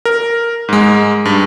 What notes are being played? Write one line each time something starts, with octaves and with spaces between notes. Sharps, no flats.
A#4
G#2 G#3
G2